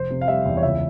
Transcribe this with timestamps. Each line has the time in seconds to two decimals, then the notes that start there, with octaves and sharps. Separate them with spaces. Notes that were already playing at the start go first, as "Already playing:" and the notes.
Already playing: F1 C5
0.10 C3
0.21 F5
0.28 G3 E5
0.45 E2
0.57 C#5
0.63 C#2 E5